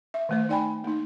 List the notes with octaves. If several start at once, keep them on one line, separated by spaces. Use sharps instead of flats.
E5
D#3 A3 C5
D#4 D5 G5 G#5 B5
A#3 D#4